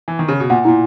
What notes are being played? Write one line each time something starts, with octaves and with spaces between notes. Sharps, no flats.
E3
D#3
C#3
B2
A#2 F#5
A#2 E4